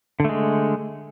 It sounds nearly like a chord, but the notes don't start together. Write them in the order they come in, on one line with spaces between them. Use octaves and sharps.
D3 A3 G#3